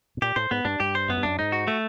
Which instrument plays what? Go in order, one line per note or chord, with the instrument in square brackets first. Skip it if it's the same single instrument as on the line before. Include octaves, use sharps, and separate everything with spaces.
[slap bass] B2
[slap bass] A#2 [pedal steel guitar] G4
[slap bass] A2 [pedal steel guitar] C5
[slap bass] G#2 [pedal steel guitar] B3
[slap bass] G2 [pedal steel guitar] D4
[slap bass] G2 [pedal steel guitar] G4
[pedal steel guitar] C5
[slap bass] F#2 [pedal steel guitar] B3
[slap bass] G2
[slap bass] F#2 [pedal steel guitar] D4
[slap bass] G#2 [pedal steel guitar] D#4
[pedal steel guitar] F#4
A3